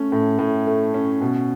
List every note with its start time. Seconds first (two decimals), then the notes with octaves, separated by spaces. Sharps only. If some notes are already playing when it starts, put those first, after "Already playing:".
Already playing: A3 C#4
0.12 A2
0.39 A2
0.67 A3
0.94 C#4
1.21 B2